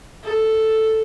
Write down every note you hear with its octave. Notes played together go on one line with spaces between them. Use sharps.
A4